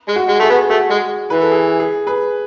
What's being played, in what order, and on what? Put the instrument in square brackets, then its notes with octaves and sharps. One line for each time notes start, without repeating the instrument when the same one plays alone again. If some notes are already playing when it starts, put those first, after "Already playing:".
[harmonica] G#3
[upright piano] F#4
[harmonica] G#3
[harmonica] A3 [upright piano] G#4
[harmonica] B3
[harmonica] A3 [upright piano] F#4
[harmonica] G#3
[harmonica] E3 [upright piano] B4
[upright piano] A4
G#4
G#4
G#4 B4